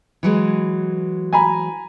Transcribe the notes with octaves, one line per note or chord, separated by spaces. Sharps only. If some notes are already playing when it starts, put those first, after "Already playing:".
E3 F#3 G#3
G#5 A#5 B5